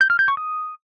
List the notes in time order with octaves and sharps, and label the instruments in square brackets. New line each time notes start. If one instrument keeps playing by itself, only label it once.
[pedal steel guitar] G6
F6
G6
C#6
D#6